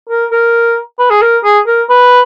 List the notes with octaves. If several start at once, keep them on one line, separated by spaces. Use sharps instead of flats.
A#4
A#4
B4
G#4
A#4
G#4
A#4
B4